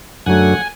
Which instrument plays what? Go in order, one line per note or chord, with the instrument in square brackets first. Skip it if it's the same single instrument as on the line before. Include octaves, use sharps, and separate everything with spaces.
[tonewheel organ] F#2 D3 F#3 A3 F#5 G#5